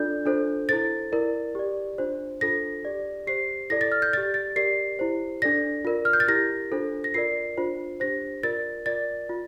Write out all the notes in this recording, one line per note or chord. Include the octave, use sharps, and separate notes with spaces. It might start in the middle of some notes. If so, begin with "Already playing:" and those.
Already playing: D4 F4 A4 D5 G6
D4 F4 A4 C5
E4 A4 C5 A6
E4 A#4 D5
G4 D5
D4 F4 C5
D4 F4 A4 C5 A#6
G4 D5
G4 C5 C7
E4 A4 D5 A#6
A6
F6
G6
G4 D5 A6
A6
G4 A#4 D5 C7
E4 G4 C5
D4 A4 D5 A#6
F4 A#4 D5
F6
G6
A6
E4 G4 A#4 A#6
D4 F4 A4 C5
A#6
F4 A#4 D5 C7
D4 F4 C5
D4 G4 C5 A#6
F4 A#4 D5 A6
F4 A#4 D5 A6
F4